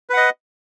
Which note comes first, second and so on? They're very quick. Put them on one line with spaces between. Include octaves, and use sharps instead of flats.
B4 F#5 D#5